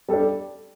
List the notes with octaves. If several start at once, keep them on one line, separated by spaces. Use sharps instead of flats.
G3 D4 A4